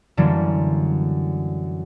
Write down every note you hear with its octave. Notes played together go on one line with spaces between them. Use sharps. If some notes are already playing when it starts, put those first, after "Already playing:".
F#2 D3 E3 F#3 G3 A#3